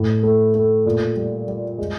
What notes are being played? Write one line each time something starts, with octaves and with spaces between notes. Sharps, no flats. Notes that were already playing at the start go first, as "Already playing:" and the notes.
Already playing: A2
A3
A3
A#2
G3
G3
G#3